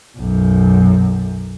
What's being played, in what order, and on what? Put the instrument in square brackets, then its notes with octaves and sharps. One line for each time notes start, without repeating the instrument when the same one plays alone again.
[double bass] B1 F#2